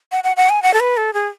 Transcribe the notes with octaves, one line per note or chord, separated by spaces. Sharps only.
F#5
F#5
F#5
G#5
F#5
A4
B4
A4
G#4